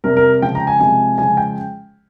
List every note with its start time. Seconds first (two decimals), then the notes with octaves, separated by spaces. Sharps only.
0.04 C3 G3 A#4
0.17 A#4
0.42 C#3 F3 G#3 G5
0.55 A#5
0.67 G#5
0.80 C3 F3 G#3 G#5
1.18 C#3 F3 G#3 G#5
1.37 G5